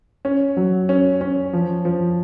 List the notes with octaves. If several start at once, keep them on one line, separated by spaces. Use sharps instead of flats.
C#4
F#3
C#4
C#4
F3
F3